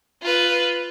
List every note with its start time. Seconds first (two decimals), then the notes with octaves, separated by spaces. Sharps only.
0.22 F4 B4